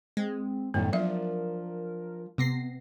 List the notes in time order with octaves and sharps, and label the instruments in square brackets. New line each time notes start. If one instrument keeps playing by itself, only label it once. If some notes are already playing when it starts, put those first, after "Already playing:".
[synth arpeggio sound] G#3 [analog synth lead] C4
[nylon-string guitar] F#2 A2 D#3 [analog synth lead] G3 [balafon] B3
[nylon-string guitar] F3 D4 [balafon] F#3 E5 [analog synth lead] A#4
[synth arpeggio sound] C3 A#6 C7 [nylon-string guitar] B3